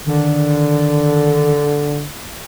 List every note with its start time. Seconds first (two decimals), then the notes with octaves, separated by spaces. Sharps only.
0.07 D3 D#3